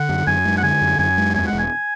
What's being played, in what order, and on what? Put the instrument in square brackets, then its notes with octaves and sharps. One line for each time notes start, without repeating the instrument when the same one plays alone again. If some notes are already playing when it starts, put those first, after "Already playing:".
Already playing: [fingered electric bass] D3 [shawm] F#5
[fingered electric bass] F#2
[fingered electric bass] F#2 [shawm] G#5
[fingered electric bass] G#3
[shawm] F#5
[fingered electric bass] D3 [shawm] G#5
[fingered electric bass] F#2
[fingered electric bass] F#2 [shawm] G#5
[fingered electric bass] G#3
[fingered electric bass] E2 [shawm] G#5
[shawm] F#5
[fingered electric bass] E1
[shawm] G#5